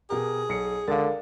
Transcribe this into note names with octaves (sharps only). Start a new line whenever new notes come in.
B2 G4 G#4 A#4
B1 C7 C#7
C#2 D3 A#4 F5 A6